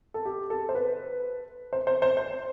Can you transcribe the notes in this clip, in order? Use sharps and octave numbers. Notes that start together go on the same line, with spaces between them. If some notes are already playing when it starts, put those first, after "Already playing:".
A4
G4
A4
C5
B4
C5
C5
C5
C5